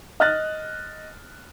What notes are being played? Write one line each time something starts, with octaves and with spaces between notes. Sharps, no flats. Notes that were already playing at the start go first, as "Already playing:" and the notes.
D#5 F6 F#6 A6